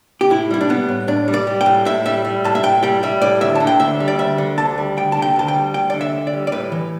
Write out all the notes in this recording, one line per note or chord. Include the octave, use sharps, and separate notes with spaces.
G4
A2 E4
G3 E4
D4
G3 B3
A2
A2 D4
G3
D5
G3
G5
A2
A2 E5
G3 E5
G3
A2 A5
E5
A2 G5
G3 G5
G3 E5
A2 D5
D2 E5
D3 A5
G5
D2 E5
G3
D5
D2 E5
D3
D2 A5
G3
D2 G5
D3 A5
G5
D2 A5
G5
G3
D2 G5
D3 D5
E5
D2
D5
G3
D5
A2 B4
E3